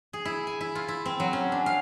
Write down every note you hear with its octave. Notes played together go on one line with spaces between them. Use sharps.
G#4
E4
G#5
E4
F4
E4
C4
F#3
C#4
D4
F5